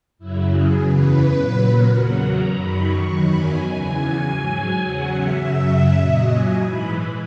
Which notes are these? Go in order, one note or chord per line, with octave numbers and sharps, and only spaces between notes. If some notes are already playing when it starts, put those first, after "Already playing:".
F#2 C#3 F#3 E4
G#4
E2 C#3 E3 B4
A#2 F#3
A#4
E2 C#3 F#3 F#5
A#5
F#2 D#3 F#3 B5
C#6
E2 D#3 F#3 B5
G#5
E2 C#3 E3 G#5
G#5
G#2 F#3
E2 C#3 F#3 F#5
E5
F#2 C#3 F#3
A#2 F#3 D#5
G#5
G#2 E3 B5